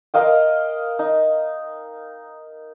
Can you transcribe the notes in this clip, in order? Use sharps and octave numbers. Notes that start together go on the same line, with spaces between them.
A#4 D#5 F5 G5
D#4